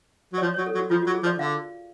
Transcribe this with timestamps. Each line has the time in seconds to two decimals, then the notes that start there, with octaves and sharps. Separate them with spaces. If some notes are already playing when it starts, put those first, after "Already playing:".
0.33 F#3
0.38 D5
0.42 F3 C#5
0.54 F#3 C#5
0.66 A4
0.74 F#3
0.78 F#4
0.90 F3 F4
1.02 F#3 F#4
1.14 G#4
1.23 F3
1.26 D5
1.39 D3 F5